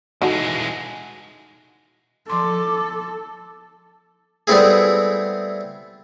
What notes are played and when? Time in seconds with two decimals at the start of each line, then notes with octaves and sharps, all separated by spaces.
0.22 E3 G#3 D#4 F#4 A4
2.30 F3 A4 C6 D6
4.47 G3 A3 B3 C4 E4 G#4